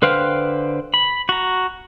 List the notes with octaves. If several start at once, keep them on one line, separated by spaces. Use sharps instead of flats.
D3 B4 C5 F5 G5
B5
F#4 A#5